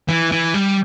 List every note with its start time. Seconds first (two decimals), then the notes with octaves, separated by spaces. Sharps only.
0.09 E3
0.32 E3
0.54 G3